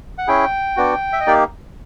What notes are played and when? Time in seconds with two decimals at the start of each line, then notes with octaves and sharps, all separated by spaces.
0.18 F#5
0.27 C#4 E4 G#4 G5
0.77 B3 D4 F#4
1.13 E5
1.20 D#5
1.27 A#3 D#4 G4 D5